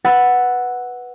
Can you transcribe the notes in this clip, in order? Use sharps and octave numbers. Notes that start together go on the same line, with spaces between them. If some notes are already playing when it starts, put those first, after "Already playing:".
B4 F#5 E6 A6